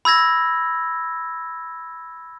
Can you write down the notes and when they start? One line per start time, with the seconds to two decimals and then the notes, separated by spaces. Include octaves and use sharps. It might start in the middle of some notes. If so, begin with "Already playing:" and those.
0.05 B5 E6 G#6 A#6